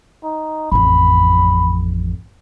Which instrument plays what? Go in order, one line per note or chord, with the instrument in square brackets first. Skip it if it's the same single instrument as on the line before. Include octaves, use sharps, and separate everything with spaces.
[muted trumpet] D#4
[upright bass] A1 F2 [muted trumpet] B5